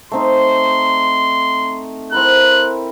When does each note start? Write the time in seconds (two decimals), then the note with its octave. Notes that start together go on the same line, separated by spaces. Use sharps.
0.12 A3 C4 D#4 C6
2.12 C4 E4 A#4 F#6